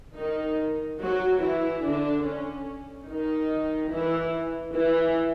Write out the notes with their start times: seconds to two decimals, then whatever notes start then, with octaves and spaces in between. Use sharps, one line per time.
0.18 D#3 D#4
1.02 F#3 F#4
1.42 E3 E4
1.85 D3 D4
2.26 C#4
3.09 D#3 D#4
3.92 E3 E4
4.75 E3 E4